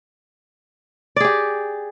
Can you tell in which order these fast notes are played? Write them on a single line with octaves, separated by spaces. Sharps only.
D5 G#4 G4